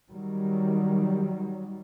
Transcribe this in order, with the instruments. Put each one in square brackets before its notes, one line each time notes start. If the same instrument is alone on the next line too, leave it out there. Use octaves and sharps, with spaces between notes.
[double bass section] D#3 F#3 G3